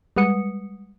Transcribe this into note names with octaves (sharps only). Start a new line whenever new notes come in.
G3 G#3 B4 F#5 D#6 C#7